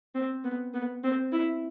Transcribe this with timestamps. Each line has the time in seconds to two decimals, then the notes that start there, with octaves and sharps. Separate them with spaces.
0.15 C4
0.44 B3
0.74 B3
1.04 C4
1.32 E4